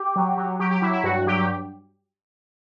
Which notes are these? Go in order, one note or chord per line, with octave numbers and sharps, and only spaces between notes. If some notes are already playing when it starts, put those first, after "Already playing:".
Already playing: G4
F#3
F#3
F#3 G4
G4
F#3 E4
E4
G2 F#4
F#3 G4